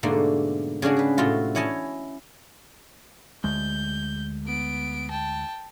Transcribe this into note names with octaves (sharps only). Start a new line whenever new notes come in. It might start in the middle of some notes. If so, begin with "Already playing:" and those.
G#2 B2 D3 A3 A#3
C#3 C#4 D4 F#4 G#4
G#4 B4
A2 C3 A3 F4 F#4
C#4 E4 C#5 D#5 G#5 A5
D2 G#3 G6
B3 D7
G5 A5